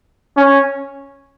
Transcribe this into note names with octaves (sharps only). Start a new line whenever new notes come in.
C#4